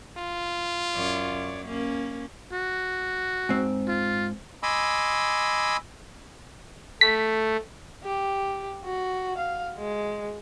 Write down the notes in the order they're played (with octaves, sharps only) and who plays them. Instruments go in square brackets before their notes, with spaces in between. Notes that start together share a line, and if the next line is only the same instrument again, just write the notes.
[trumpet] F4
[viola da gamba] F#2 C#5 D5
A#3 C#4
[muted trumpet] F#4
[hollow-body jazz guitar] G#2 C4
[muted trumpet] F4
[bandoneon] D#5 G#5 B5 C6 D6 E6
[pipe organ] A3 [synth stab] B6
[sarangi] G4
F#4
F5
G#3